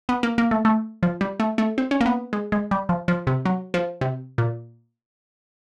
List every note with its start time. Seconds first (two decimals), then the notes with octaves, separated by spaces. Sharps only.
0.09 B3
0.23 A#3
0.38 A#3
0.51 A3
0.65 A3
1.03 F3
1.21 G3
1.40 A3
1.58 A3
1.78 C4
1.91 C#4
2.01 A#3
2.06 B3
2.33 G#3
2.52 G#3
2.71 G3
2.89 F3
3.08 F3
3.27 C3
3.45 F#3
3.74 F3
4.01 C3
4.38 A#2